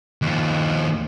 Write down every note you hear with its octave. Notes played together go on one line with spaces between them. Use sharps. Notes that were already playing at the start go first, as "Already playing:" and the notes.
D#2 F3